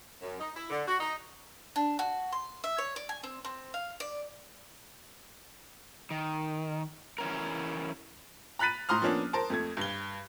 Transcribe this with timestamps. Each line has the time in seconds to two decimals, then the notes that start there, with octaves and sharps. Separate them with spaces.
0.22 F#2
0.40 D#4
0.54 E4
0.70 D3
0.88 F#4
0.99 D#4
1.76 D4
1.99 F#4
2.32 C6
2.64 E5
2.78 C#5
2.96 D5
3.09 G#5
3.23 C4
3.45 C4
3.74 F5
4.00 D5
6.11 D#3
7.18 E3 C#4 A#4
8.59 A#5 B5 F#6 A6 B6 D#7
8.89 A2 A#5 C6 D#6 F6
9.02 F3 A#3 B3 C#4 D4
9.33 A#4 C5 A5
9.50 F2 A3 G#6
9.77 G2 G7